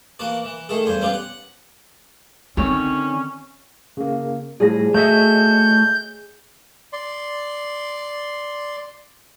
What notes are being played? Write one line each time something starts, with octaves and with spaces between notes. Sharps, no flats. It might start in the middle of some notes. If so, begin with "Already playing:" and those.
E3 A#3 F#4 A5
E3
D#3 A3 G#4 A4
E2 G2 C5 G#5
G3 B3 C#4 F4 G4 G#4
F#5
D3 D#3 C4 C#4 C#5
C#3 A#3
A2 F3 G3 G#4 A#6
A3 F#4 C#5 D#5 E5 G6
D5 C6